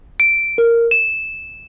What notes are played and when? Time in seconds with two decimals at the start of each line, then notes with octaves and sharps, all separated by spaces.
0.20 D7
0.58 A#4
0.91 E7